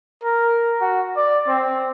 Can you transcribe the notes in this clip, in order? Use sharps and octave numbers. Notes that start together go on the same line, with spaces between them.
A#4
F#4
D5
C4